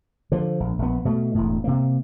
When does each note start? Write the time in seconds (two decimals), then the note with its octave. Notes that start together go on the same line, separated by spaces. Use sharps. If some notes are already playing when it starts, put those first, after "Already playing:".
0.32 D3 F3
0.60 A#1
0.79 A#1 B3
1.05 B2 A3
1.35 E1 A2
1.64 C3 A#3